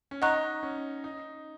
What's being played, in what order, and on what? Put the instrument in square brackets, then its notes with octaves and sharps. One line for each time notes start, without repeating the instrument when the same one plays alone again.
[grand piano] C#4
[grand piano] D#4 [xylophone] D#5 F#5 A#5 C#6 F#6
[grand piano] C#4
D#4